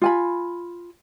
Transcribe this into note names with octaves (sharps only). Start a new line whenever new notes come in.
F4 G#5 B5